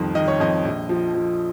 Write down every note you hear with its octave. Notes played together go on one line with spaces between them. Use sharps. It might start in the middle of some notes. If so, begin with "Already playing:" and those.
Already playing: C2 F2 D#3
D#3 D#5
C#5
F2 D#5
A#1
F3
F3